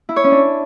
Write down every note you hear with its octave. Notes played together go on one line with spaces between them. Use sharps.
E4
C#5
C#4
D4